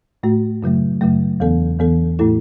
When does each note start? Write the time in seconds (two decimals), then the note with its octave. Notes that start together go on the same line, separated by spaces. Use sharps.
0.23 A2 A3 F#4
0.63 F#2 C#3 F#3 A3
1.01 F#2 C#3 F#3 A3
1.40 E2 E3 B3 A4
1.79 E2 E3 B3 A4
2.19 A2 A3 E4 A4